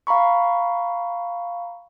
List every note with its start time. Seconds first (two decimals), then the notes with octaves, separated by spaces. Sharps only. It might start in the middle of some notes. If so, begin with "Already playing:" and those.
0.07 F5 A#5 B5 C#6